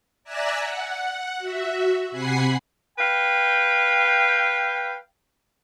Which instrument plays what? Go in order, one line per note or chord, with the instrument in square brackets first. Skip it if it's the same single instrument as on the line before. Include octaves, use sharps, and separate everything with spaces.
[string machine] D5 E5 G#5 A#5 E6 F#6
F#5
F#4 E5
C3 F#5 G#5 B5 C7
[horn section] B4 F5 G5